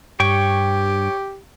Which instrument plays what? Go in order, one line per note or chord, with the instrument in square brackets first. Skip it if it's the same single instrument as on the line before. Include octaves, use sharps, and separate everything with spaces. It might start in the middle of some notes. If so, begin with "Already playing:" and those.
[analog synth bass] G2 [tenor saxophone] G4 [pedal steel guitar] C#5 G5 C#6